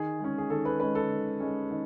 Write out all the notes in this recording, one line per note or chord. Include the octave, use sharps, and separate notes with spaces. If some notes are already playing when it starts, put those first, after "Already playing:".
Already playing: D#3 G#4
G#3 C#4
G#4
D#3 A4
B4
G#3 C#4 B4
A4
D#3
G#3 C#4
D#3